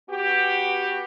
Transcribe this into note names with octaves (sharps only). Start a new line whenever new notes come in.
B3 F#4 G4